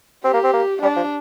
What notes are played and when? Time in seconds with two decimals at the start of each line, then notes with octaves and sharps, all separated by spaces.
0.24 C4 G4
0.33 A#3
0.44 C4
0.53 A#3
0.82 G3 D4
0.96 F3